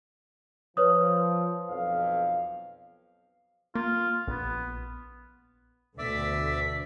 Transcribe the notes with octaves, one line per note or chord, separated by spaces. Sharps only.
F3 B4 C#5 D#6
B1 F2 F5
A#3 F4
A#1 B3
D2 B2 D3 D5 E5 D6 B6